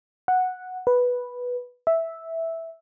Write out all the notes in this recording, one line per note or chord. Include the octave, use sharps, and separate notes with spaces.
F#5
B4
E5